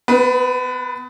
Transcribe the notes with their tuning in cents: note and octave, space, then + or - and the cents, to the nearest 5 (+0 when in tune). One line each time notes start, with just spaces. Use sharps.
B3 +30 B4 -20